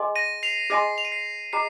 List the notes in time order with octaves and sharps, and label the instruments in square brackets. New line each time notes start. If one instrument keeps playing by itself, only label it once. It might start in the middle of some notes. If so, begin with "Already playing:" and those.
Already playing: [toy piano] G#4 D#5 G#5 C6
[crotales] A#6 D#7
C7 F7
[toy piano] G#4 D#5 G#5 C6 [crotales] A#6 D#7
[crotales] F7
D#7
C7
[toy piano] G#4 D#5 A#5 [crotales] C7